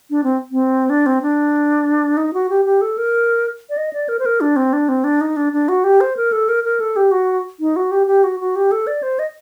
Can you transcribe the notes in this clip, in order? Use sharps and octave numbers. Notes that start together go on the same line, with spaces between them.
D4
C4
C4
D4
C4
D4
D#4
F#4
G4
G4
A4
A#4
D5
D#5
D5
A#4
C5
A#4
D4
C4
D4
C4
D4
D#4
D4
D4
F#4
G4
C5
A#4
A4
A#4
A#4
A4
G4
F#4
D#4
F#4
G4
G4
F#4
F#4
G4
A4
D5
C5
D#5